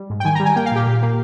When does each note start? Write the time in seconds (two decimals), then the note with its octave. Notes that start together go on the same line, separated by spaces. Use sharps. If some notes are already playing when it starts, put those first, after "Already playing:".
Already playing: G3
0.10 G#2
0.20 G5
0.25 D#3 G#5
0.35 G3 A#5
0.46 G#5
0.56 A#3 G5
0.66 F5
0.72 A#2 G4
0.87 A#2
1.02 A#3